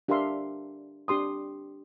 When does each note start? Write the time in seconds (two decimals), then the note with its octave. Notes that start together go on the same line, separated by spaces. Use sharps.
0.08 D4 G4 A#4 E5 F5 C6
1.08 D4 G4 C6 D#6